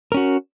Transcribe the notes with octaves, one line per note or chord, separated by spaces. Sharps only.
C#4 F#4 A#4